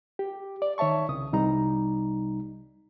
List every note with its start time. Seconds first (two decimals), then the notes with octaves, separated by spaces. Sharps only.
0.19 G4
0.62 D5
0.78 D#3 C#5 E5 A5 C#6
1.09 C2 C#3 D#6
1.32 C2 C3 G3 D#4 A#5